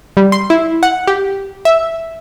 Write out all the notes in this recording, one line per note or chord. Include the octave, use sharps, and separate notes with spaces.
G3
C6
E4
F#5
G4
E5